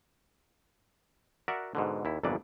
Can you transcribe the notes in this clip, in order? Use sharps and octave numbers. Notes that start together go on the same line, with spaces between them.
F#4 A#4 D5 E5 F#5
G#2 B2 D3
D#2 E4
G1 F2 A#2 E3 B4 D5